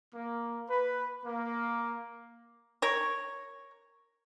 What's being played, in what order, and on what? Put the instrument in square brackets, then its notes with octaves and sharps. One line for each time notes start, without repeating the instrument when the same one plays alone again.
[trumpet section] A#3
B4
A#3
[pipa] A#4 C#5